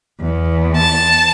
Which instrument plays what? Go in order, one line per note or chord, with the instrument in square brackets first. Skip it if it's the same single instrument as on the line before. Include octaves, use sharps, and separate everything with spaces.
[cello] E2
[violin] A5